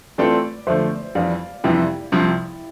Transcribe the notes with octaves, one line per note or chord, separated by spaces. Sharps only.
E3 A3 C4 F4 A4 B4 D5
D3 F3 A3 C5 E5
F2 E3 G3 D5 F5
F2 C3 E3 G3 E4 G4
C2 C3 F3